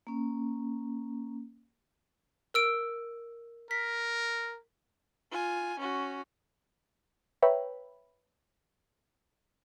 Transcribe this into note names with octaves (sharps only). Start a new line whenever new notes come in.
A#3 C#4
A#4 E6 D7
A#4 B6
F4 G#5
C#4 F#4
B4 C#5 E5 G5 A#5 B5